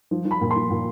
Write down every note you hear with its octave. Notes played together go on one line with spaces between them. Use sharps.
F3
F3
B5
A#2
C6
F3
A#2